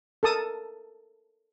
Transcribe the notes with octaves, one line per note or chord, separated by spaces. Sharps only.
A4 A#4 A5 D#6